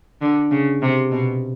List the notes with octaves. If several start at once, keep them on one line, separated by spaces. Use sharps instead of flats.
D3
C#3
C3
B2